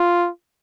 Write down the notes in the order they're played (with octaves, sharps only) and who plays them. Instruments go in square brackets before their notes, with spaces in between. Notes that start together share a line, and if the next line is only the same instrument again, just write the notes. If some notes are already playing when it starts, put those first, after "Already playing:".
Already playing: [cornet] F4